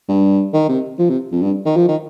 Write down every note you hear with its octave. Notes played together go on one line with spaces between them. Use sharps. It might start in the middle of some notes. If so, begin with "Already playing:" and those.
G2
D#3
C3
F3
C3
F2
G2
D#3
F3
D#3